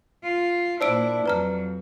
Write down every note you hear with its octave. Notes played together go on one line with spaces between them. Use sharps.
F4
A#2 D4 E4 C5 E6 D7
F2 F#3 B4 A#5 F6